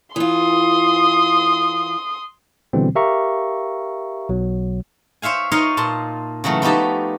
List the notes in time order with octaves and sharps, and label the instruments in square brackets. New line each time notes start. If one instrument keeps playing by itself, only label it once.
[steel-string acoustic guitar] E3 F4 [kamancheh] C6 D#6
[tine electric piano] B2 D3 E3 G3 C4
G4 A#4 E5 F5 A#5 C#6
B1 B2 F#3
[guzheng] C5 C#5 E5 F5 G#5
D#4 F4 C#5 D#5 F5
A#2 A5 C6
C#3 E3 F#3 A3
F3 B3 D#4 F#4 G4 A5